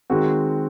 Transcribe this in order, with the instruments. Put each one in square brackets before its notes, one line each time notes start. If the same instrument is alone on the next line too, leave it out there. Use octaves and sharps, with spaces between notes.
[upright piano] D#3 G#3 C4 F#4